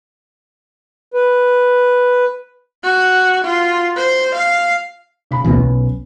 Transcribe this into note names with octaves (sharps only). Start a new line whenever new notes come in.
B4
F#4
F4
C5
F5
C#3 B5
D2 B2 E3 B3 C#4
B1